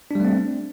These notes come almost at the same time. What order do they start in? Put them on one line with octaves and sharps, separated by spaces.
D4 G3 A3 C4